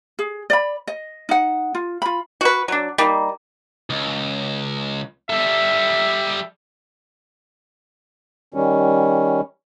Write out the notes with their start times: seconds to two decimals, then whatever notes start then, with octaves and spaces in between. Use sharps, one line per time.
0.19 G#4
0.50 D5 B5
0.87 D#5
1.29 D#4 F#5
1.75 F4
2.02 F4 B5
2.41 F#4 B4
2.68 F#3 D4
2.98 G3 A#3 D#4
3.90 C#2
5.30 G3 A4 E5
8.54 D#3 G3 C#4